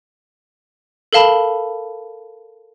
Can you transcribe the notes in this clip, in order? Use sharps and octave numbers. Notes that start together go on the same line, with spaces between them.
A4 A#4 F5 A5 B5